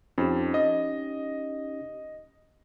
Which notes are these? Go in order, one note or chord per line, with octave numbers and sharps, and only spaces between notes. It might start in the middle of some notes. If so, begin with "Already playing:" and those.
F2 C#4 D#4 G4
D#5